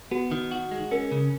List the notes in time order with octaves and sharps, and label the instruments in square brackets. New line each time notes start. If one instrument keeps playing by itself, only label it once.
[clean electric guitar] B3 [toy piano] F#4
[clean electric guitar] D#3
F#4
G#3
[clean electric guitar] C#4 [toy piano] A#4
[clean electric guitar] C#3